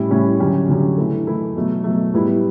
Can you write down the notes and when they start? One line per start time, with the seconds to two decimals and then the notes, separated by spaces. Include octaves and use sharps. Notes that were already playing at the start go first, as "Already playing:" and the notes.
Already playing: A2 G3 C#4 E4
0.10 A2 G3 C#4 E4
0.40 D3 F#3 C#4 G4
0.68 D3 F#3 C#4 G4
0.97 E3 A3 E4 A4
1.27 E3 A3 E4 A4
1.56 B2 F#3 A3
1.84 B2 F#3 A3
2.14 A2 G3 B3 E4